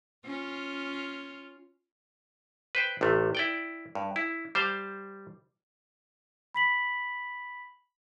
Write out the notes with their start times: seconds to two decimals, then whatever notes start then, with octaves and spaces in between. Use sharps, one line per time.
0.25 C#4 F4
2.75 B4 C5 G5
3.01 A1 C3 A3
3.35 E4 D5 G5
3.95 G2
4.16 E4
4.55 G3 C5 F5 A5
6.54 B5 B6 F#7